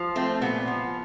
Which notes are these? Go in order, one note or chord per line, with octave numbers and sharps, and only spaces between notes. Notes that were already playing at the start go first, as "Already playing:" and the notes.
Already playing: F3
A3 C4
A#2 B3
F3